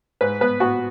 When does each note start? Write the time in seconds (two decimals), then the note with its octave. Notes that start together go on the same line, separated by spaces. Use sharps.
0.21 G#2 B4
0.41 B3 B4
0.60 B3 F#4